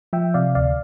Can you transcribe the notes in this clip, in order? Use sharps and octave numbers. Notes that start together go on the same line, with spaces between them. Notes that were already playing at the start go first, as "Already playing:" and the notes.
F3 E5 G5
C3 D5 F5
D2 D5 F5